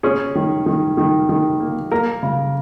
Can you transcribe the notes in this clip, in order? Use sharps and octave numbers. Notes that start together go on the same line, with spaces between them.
C#4 G#4
D#3
D#3
D#3
D#3
A#3
A#3 A#4
C#3